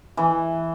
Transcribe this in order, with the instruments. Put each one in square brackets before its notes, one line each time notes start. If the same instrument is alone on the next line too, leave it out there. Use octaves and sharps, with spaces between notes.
[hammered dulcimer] E3